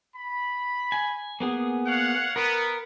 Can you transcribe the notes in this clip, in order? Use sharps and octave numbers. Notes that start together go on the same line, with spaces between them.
B5
G#5
A#3 B3 G#4
C#5 F5 F#5
B3 A#4